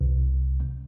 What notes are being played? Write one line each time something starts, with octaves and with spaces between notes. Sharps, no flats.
C2